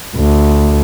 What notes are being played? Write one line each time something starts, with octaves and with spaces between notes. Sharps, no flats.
D2